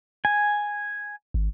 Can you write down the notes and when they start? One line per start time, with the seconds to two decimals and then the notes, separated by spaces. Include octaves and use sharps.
0.25 G#5
1.34 G#1